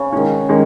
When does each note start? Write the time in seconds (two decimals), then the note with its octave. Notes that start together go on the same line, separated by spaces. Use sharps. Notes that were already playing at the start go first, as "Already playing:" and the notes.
Already playing: C#3
0.12 D#3 G#3 C#4
0.49 D#3 G#3 C#4